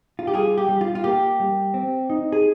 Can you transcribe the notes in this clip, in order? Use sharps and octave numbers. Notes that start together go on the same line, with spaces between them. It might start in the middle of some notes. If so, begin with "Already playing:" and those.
F4
G4
G3 F4 G#4
G4
G3
F4
F4
A#3 G4
G3
C4
D#4
G#4